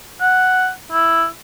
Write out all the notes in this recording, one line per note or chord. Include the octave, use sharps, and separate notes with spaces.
F#5
E4